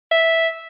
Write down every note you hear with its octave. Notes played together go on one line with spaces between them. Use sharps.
E5